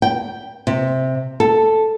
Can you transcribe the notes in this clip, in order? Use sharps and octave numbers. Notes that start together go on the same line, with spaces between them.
G5
C3
A4